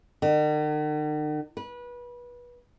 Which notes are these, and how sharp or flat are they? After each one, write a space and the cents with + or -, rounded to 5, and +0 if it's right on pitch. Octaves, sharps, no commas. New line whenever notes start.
D#3 -45
B4 -25